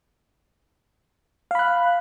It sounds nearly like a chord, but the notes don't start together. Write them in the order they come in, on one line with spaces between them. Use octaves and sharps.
F5 B5 F#6